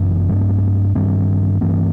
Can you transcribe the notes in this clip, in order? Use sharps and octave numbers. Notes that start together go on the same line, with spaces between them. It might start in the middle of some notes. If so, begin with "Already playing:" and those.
Already playing: G1 F#2 E3
G2 F#3 A3 C4
G2 D#3 G3 C4
G2 E3 A3 C4